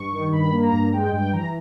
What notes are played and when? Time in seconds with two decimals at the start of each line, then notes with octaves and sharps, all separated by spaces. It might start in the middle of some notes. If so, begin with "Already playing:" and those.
Already playing: G2 C#6
0.12 D#3
0.32 G2 B5
0.53 A#3
0.63 A#5
0.73 G2
0.93 G#3 G5
1.13 G2 G5
1.33 E3 A#5